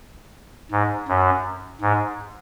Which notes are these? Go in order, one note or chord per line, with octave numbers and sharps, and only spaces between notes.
G#2
F#2
G#2